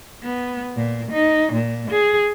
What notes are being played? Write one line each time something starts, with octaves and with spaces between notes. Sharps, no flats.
B3
A#2
D#4
A#2
G#4